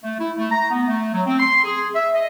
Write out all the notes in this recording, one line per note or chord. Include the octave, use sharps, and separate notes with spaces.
A3
E4
A3
A#5
B3
A3
F#3
C4
C6
G#4
E5
D#5